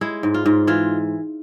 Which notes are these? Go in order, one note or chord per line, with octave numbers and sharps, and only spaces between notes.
G#3 E4
G#2
F4
G#2
E3 F4